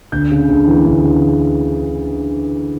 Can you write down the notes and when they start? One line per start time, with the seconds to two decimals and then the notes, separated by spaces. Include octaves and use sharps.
0.12 D2 G6
0.31 C#3
0.49 D2
0.67 E3
0.86 D2
1.04 C#3